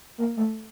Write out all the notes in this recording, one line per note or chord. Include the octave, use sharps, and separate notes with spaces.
A#3
A3